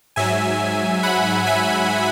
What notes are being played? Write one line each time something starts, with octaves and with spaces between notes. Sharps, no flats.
G#2 F#3 E5 G#5
F#5 B5
E5 G#5